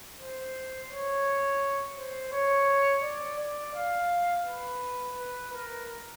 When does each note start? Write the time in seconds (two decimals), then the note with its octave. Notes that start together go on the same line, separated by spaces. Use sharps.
0.18 C5
0.89 C#5
1.96 C5
2.32 C#5
3.03 D5
3.39 D5
3.75 F5
4.46 B4
5.17 B4
5.53 A#4